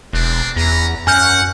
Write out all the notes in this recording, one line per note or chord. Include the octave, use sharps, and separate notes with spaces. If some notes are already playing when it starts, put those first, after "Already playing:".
E1 C4 D4
E2 C#4 A#5
F#2 F#5 G#5 F6 G6